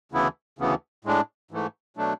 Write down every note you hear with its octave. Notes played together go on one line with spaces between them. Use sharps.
D2 C#3 E3 B3 E4
D2 C#3 E3 B3
A2 G#3 D4
G#2 E3 A3
B2 F#3 A3 D4